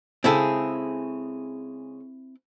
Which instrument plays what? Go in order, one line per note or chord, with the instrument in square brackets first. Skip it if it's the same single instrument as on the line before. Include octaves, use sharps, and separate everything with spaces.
[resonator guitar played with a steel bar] C#3 G#3 G#4 [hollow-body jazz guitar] C4 E4 A4